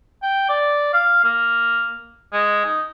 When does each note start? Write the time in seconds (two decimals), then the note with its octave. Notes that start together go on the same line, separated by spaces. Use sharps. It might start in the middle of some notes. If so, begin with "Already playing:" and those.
0.23 G5
0.49 D5
0.94 F5
1.24 A#3
2.33 G#3
2.65 D#4